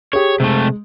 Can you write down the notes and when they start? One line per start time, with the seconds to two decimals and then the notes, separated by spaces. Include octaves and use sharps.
0.13 G4 G#4 C#5
0.40 C3 G#3 A3